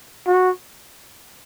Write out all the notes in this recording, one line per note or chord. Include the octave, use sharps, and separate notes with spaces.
F#4